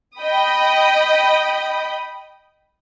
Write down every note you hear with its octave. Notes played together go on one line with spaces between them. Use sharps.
D#5 G5 B5 D#6